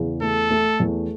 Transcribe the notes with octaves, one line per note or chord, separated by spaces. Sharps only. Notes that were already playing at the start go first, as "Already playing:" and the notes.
Already playing: E2 C#3
A3 A4
A3
E2